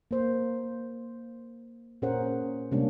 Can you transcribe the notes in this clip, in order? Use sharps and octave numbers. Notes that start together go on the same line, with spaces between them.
A#3 C5
A#2 C#4 G#4 A#4 C5 F#5
C3 G3 G#3 A#3 C#4 D4